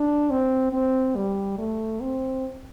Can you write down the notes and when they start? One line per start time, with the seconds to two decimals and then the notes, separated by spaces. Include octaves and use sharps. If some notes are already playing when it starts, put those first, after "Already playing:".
Already playing: D4
0.30 C4
0.73 C4
1.16 G3
1.58 A3
2.01 C4